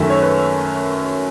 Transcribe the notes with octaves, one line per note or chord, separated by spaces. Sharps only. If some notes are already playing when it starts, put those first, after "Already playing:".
Already playing: F#2 D#3 F#3 A3 E5
C#5
B4